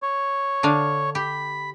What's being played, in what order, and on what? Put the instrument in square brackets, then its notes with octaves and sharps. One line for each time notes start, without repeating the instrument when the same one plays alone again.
[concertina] C#5
[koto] D3 D4 F5
[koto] G4 [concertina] B5